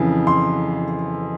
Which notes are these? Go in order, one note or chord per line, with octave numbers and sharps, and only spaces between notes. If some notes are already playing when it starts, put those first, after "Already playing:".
Already playing: F2 C#3 E3
C6